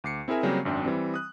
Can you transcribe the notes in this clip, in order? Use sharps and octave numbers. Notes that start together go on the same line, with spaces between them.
D2 D6 C7 C#7
C4 E4 G#4 A#4 E5 G#5
C#3 F#3 G3 A#3 C4 C#4
G#1 F#2 D4 G5
E3 G3 C4
D#6 F#6